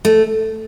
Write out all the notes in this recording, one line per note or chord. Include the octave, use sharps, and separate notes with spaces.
A3